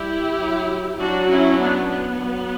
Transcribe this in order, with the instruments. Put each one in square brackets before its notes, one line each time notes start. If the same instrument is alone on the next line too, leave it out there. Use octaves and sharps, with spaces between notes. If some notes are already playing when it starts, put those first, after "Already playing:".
Already playing: [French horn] G3 [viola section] E4 G4
[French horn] F#3
[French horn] F#3 [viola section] D4 F#4
[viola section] C#4 E4
B3 D4
B3
[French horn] F#3